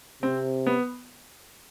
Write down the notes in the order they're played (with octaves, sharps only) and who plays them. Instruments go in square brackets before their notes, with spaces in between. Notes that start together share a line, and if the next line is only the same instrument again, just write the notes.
[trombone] C3 [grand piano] C4
[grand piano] B3